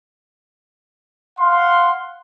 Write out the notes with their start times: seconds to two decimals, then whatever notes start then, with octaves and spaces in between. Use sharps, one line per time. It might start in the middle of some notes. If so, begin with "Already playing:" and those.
1.39 F5 F#5 C6